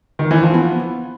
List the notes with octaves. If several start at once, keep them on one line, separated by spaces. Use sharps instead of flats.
D#3
E3
F3
B3